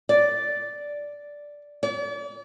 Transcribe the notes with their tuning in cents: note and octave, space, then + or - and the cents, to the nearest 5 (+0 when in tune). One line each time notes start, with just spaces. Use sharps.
D5 -5
D5 -40